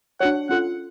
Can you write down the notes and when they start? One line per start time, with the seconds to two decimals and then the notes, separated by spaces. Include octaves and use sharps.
0.20 D4 F#4 C#5 F#5
0.49 C#4 F4 A4 F#5